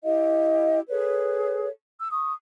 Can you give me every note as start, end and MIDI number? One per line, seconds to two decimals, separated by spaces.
0.04 0.79 64
0.04 0.79 67
0.04 0.79 75
0.04 0.79 77
0.89 1.67 68
0.89 1.67 69
0.89 1.67 71
0.89 1.67 73
1.99 2.11 88
2.11 2.32 85
2.11 2.32 87